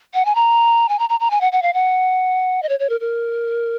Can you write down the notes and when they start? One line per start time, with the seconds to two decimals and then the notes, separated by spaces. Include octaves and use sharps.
0.14 F#5
0.25 G#5
0.35 A#5
0.89 G#5
0.99 A#5
1.09 A#5
1.20 A#5
1.31 G#5
1.41 F#5
1.52 F#5
1.62 F5
1.74 F#5
2.63 D#5
2.69 C#5
2.80 C#5
2.89 A#4
3.00 A#4